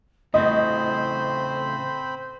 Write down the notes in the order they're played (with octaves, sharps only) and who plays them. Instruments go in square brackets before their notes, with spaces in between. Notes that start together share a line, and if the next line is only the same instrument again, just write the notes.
[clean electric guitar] A2 C#3 A3 [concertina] C4 B5 [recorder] C5 [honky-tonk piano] D#5